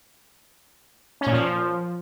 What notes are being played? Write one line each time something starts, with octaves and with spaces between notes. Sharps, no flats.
C#4
A#2
F3